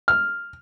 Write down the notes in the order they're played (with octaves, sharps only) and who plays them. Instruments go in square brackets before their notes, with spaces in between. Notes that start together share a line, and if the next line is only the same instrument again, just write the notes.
[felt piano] F6